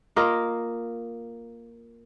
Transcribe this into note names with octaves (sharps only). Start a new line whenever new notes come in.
A#3 F4 A#4 D#5